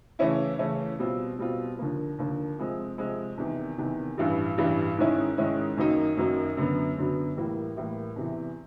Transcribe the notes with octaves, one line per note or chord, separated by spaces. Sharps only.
C#3 E3 A3 C#4 E4
C#3 E3 A3 C#4 E4
B2 G3 C4 F4
B2 G3 C4 F4
D#2 D3 F3 A#3
D#2 D3 F3 A#3
C3 F3 G#3 C4
C3 F3 G#3 C4
E2 C3 D#3
E2 C3 D#3
A1 G2 E3 G3
A1 G2 E3 G3
G#2 D#3 G#3 C#4 E4
G#2 D#3 G#3 C#4 E4
F#2 D#3 F#3 A#3 D#4
F#2 D#3 F#3 A#3 D#4
F#2 D3 F#3 B3
F#2 D3 F#3 B3
A2 E3 G3 A#3
A2 E3 G3 A#3
E2 C3 E3